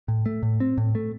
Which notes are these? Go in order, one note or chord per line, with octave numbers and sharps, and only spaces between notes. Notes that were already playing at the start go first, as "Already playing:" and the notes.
A2
A3
A2
C4
A2
A3